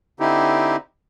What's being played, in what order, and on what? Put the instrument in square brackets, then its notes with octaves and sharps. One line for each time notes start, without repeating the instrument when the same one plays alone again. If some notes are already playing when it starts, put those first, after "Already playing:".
[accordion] D3 C4 D#4 E4 G4